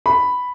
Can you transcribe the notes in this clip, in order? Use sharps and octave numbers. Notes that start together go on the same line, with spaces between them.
B5